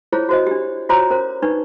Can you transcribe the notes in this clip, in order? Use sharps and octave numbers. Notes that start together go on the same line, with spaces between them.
E4 F4 G#4 C5 C#5
F#4 C5 D#5
D4 G4
F4 F#4 C5 C#5 A#5 D6
C#4 A#4 C5
D4 D#4 B4 C#6